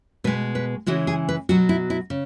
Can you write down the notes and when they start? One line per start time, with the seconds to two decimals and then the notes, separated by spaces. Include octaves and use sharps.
0.24 B2 G#3 B4
0.55 B4
0.86 C#3 E3 G#3 F#4
1.07 G#4
1.29 B4
1.49 B2 F#3 F#4
1.69 E4
1.90 E4
2.10 C#3